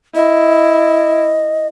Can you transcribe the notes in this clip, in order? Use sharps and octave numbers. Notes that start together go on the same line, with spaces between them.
E4 D#5